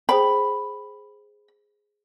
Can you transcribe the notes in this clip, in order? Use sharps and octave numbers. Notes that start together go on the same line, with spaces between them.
G#4 C5 G5 B5